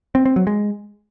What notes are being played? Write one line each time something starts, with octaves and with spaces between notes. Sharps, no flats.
C4
C4
F#3
G#3